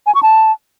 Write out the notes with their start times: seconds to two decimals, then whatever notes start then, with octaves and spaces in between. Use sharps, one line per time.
0.06 G#5
0.15 C#6
0.23 A5